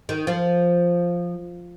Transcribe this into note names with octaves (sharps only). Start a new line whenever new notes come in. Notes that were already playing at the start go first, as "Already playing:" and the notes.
D#3
F3